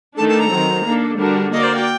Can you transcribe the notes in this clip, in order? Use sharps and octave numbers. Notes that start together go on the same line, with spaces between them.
D#3 A3 D4 A4 A5
A5
A#5
D#3 F#3 C4
A#3 D4 A4
D3 G3 D4 F#4 A#4
A#3 F#4 A#4 D5 D#5
C5
G5